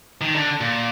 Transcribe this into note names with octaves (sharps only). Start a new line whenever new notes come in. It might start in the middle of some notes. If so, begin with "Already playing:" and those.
D#3
D3
A#2